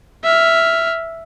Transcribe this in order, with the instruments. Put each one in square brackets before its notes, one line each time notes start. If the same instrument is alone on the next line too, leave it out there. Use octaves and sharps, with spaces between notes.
[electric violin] E5 F6